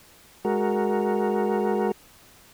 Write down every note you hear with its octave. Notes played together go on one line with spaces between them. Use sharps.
G#3 F#4 A#4